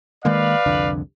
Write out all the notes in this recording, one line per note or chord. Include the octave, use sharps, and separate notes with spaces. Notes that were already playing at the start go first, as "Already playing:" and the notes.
D#3 G#3 A#3 B4 D5 F5
C2 F2 D3